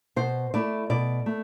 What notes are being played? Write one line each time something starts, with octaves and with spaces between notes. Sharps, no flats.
B2 C5
A3 E4 D5
B2 D5
A3